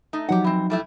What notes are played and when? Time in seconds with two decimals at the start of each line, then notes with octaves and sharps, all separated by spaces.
0.13 A3 D#4
0.29 F3 F#3 D#4 G4 F#5
0.44 E3 C4
0.70 G3 A3 E4